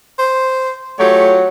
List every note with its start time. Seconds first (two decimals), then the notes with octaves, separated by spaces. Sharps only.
0.19 C5
0.99 F#3 A3 F4 G4 C#5